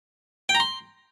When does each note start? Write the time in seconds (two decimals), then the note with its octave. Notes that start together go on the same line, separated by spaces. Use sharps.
0.49 G5
0.55 A#5
0.60 C6